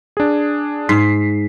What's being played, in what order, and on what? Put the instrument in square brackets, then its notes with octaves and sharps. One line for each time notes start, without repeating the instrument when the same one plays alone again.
[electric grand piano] D4 G#4
[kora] G#2 [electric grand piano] B6 C7